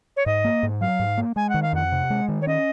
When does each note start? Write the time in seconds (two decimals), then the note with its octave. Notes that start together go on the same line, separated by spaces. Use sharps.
0.17 C#5
0.26 G#2 D#5
0.44 A#3
0.63 G#2
0.81 F#3 F5
0.99 G#2
1.18 A#3
1.36 G#3 G#5
1.49 D#3 F#5
1.62 F5
1.73 F2 F#5
1.92 C3
2.10 G#3
2.28 D#3
2.42 C#5
2.47 C#4 D#5